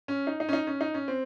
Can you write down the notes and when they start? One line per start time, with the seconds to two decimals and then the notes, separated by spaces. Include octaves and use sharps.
0.08 C#4
0.27 D#4
0.40 D#4
0.49 C#4
0.53 D#4
0.67 C#4
0.81 D#4
0.94 C#4
1.08 C4